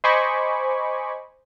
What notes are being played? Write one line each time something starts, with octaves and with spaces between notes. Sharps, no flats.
C5 D#5 G#5 B5 C#6 D6